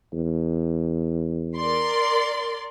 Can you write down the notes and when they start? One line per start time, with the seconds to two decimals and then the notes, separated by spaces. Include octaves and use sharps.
0.13 E2
1.58 A#4 D5 C6